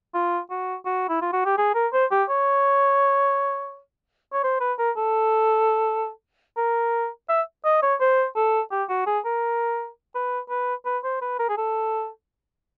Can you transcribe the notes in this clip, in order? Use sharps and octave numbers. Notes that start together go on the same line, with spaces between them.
F4
F#4
F#4
E4
F4
F#4
G4
G#4
A#4
C5
G4
C#5
C#5
C5
B4
A#4
A4
A#4
E5
D#5
C#5
C5
A4
G4
F#4
G#4
A#4
B4
B4
B4
C5
B4
A#4
G#4
A4